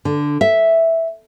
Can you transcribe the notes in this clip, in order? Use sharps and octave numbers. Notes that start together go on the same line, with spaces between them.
D3
E5